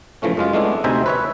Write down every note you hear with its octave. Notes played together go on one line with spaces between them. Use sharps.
C#3 E3 F3 A3 C#4
F#2 G#3 F4
G#3 A3 B3 D4 E4
D2 C3 D#4 C5 E5 G#5
B4 C#5 E5